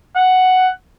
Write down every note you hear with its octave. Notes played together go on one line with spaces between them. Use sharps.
F#5